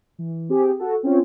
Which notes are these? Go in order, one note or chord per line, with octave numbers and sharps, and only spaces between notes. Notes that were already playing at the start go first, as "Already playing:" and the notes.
E3
C4 G4 G#4
F#4 A4
C4 C#4 F4